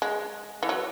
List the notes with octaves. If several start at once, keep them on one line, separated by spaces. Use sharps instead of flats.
G#3
E3
F#3